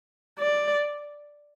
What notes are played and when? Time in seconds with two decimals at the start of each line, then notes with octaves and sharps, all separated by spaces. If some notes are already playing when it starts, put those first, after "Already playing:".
0.39 D5